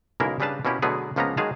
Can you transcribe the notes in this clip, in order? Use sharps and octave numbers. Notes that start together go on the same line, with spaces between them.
B1 C#3 G#3 A#3 E4 A#4
C#3 G3 D4 B4 F5 A5
B2 A#3 C#4 E4 G4
B2 D3 F#3 A3 B3 G#4
C#2 F3 A#3 B3 C#4 A#5
D#3 F#3 G#3 G#4 F5 A5